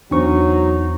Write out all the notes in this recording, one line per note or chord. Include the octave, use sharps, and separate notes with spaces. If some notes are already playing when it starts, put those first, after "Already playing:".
E2 F#3 D4 D#4 C5 C#6